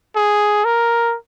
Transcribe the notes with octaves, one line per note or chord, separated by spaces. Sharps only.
G#4
A#4